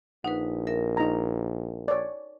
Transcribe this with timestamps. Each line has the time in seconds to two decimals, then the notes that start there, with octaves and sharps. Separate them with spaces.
0.24 A#1 D#4 B4 F#5
0.67 A#4 E5
0.97 D#4 A#5
1.88 C#5 D5